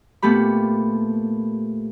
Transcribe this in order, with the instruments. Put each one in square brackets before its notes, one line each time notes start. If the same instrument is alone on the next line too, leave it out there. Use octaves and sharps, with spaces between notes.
[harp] A#2 A3 B3 G4 B5